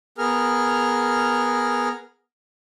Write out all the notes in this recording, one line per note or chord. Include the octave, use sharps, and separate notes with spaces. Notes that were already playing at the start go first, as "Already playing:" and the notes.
B3 G#4 A#4 F6